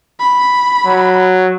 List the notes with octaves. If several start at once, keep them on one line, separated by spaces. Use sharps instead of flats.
B5
F#3